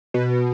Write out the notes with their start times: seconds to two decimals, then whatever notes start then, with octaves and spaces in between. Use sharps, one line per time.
0.14 B2